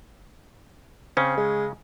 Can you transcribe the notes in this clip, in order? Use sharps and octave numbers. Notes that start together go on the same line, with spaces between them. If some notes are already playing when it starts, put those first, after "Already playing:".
C#3 C4 C#4
G#3